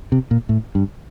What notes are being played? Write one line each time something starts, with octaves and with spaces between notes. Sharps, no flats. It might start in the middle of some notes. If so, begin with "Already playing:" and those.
C3
A#2
A2
G2